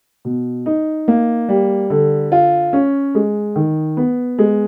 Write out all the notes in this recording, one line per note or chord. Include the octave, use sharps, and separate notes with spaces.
B2
D#4
A#3
G3
D3
F4
C#4
G#3
D#3
B3
G#3